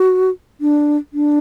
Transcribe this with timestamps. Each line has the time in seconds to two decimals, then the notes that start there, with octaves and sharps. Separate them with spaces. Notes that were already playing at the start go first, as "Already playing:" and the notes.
Already playing: F#4
0.61 D4
1.13 D4